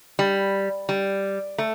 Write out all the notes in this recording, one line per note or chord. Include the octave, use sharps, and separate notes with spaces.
G3
G3
A3